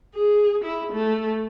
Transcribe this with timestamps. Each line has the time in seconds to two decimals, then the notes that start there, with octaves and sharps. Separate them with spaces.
0.15 G#4
0.64 E4
0.93 A3